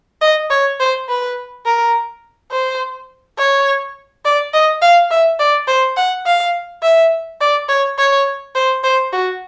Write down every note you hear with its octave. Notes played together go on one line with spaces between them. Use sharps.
D#5
C#5
C5
B4
A#4
C5
C#5
D5
D#5
F5
E5
D5
C5
F#5
F5
E5
D5
C#5
C#5
C5
C5
F#4